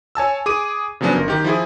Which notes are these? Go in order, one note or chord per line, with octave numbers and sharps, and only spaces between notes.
C#5 G#5 A5 E6
G#4 D6 D#7
C#3 F3 F#3 B3 C#4 D4
G1 A#4
D#3 G4
F3 E4 G#4